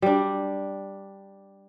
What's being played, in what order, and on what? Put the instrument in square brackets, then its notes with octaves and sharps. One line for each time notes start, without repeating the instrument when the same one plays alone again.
[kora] G3 D4